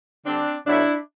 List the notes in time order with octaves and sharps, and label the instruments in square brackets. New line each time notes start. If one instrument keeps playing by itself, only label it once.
[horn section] D3 G3 C4 D4
B2 F#3 A3 D4 E4